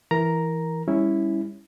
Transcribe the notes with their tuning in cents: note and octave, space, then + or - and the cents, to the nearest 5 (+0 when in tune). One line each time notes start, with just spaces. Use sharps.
E3 +0 A#4 +0 A#5 +5
G3 +30 C#4 +0 E4 -10